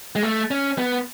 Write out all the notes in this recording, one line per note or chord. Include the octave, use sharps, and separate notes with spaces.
G#3
A3
C#4
B3